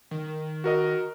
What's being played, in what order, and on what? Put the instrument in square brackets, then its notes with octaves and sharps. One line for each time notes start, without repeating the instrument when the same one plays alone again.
[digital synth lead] D#3
[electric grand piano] F#4 A#4 D#5